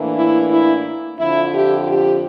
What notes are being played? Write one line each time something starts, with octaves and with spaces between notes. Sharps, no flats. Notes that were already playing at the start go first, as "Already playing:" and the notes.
Already playing: A2 E3 A#3 D4
E4
E4
F2 D3 F3 E4
G4
G4